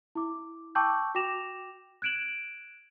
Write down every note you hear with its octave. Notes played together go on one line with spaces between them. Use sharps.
E4 D6
G5 A5 C#6 D6 E6 G6
F#4 G5 D6 A#6 E7 F7
F#6 G#6 D7 E7 F#7